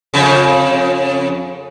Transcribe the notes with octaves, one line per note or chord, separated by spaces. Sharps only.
F2 C#3